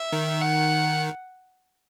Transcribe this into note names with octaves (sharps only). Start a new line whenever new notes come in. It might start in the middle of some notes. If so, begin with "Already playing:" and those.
Already playing: E5
D#3
F#5